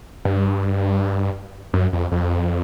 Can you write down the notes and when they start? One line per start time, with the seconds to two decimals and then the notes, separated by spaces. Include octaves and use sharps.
0.25 G2
1.74 F#2
1.93 F2
2.12 F2